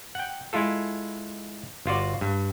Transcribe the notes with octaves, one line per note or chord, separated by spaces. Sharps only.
F#5 G5
G#3 E4 F4 A4
G1 F4 F#4 D5
G2